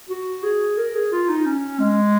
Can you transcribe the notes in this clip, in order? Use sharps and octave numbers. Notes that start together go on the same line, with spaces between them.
F#4
G#4
A#4
G#4
F4
D#4
C#4
G#3